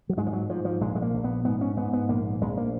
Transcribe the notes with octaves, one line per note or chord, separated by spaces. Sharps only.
F#3
G#2 G#3
F3
F#3
G#2 F3
F3
A#1 G#3
G#3
A#3
A#1
B3
G#2 B3
C#4
G#2 B3
B3
A#1 A#3
A#1 G#3
A#3